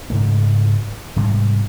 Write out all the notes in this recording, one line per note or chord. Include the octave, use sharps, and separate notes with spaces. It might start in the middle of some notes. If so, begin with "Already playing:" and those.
G#2 C#3 A3
G#2 C3 G3 G#3